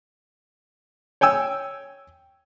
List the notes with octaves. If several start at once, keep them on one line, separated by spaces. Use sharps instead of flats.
C#5 G5 G#5 E6